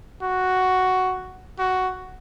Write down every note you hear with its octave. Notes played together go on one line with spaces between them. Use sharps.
F#4
F#4